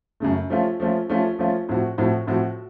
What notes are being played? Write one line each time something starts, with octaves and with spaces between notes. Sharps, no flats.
F#2 C#3 A3
F3 A3 C#4 F4
F3 A3 C#4 F4
F3 A3 C#4 F4
F3 A3 C#4 F4
A2 F3 C4 F#4
A2 F3 C4 F#4
A2 F3 C4 F#4